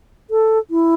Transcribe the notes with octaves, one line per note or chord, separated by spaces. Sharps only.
A4
E4